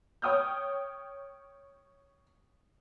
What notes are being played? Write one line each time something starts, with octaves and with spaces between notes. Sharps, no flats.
C#5 G5 D#6 F6 G6